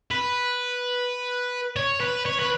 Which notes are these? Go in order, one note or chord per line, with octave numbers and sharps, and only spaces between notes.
B4
C#5
B4
C#5
B4